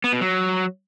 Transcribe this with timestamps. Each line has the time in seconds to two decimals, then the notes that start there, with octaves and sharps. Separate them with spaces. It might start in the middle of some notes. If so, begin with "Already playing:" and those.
0.04 B3
0.12 B2
0.21 F#3